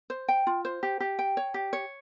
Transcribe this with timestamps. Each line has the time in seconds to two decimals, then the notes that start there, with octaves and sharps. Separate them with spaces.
0.10 C5
0.28 G5
0.47 F4
0.65 C5
0.83 G4
1.00 G4
1.19 G5
1.37 C#5
1.54 G4
1.73 C#5